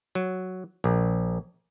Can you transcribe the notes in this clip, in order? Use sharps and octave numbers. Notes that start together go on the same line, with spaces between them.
F#3
A#1